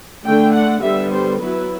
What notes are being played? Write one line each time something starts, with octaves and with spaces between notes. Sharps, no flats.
D3 A3 D4 G5
F#5
D3 G3 B3 E5
C5
F#3 B3 E4 B4